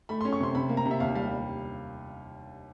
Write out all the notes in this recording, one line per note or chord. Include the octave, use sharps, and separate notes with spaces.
A3 B5
C6
C#4
C#6
C3 C6
C3 B5
A#3
A#5
C3
E5
D#2 F5
G3 F5
G3